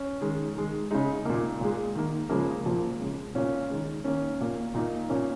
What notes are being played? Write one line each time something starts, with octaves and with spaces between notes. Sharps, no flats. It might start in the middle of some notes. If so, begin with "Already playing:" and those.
Already playing: C#4
D#3 G#3
D#3 G#3
C#3 G#3 D#4
A#2 A#3
A#2 G#3
D#3 A#3
C#3 F3 G#3 A#3
A#2 F3 A#3
C#3 G#3
A#2 A#3 C#4
D#3 G#3
D#3 A#3 C#4
A#2 A#3
A#2 A#3 D#4
A#2 A#3 C#4